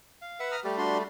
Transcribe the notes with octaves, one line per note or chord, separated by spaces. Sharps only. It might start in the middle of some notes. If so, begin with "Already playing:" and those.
F5
B4 E5 F#5
A#5 D#6 F6
G3 A3 G4
D4 F#4 C6